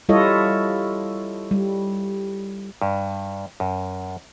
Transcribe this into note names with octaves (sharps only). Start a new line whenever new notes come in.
G3 E4 F4 A4 C#5 D#5
G3
G2
F#2